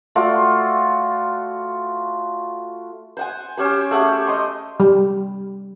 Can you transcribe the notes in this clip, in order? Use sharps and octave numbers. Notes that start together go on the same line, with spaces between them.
A3 F4 F#4 D5
C5 F#5 G#5
C#4 G4 C5
G4
A3 G#4 F#5
G4
D#5 C6
G3